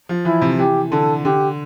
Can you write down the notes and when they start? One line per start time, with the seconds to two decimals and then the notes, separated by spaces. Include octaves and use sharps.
0.09 F3
0.25 E3 E4
0.42 C3
0.59 E3 G4
0.91 D3 A4
1.25 D3 G4